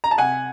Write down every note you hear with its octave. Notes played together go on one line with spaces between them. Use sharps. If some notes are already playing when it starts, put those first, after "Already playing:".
A#5
A5
C3 F#5 G#5